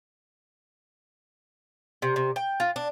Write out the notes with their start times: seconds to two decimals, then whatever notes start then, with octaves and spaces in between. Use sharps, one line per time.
2.02 C3
2.16 C3
2.36 G5
2.60 F4
2.76 D4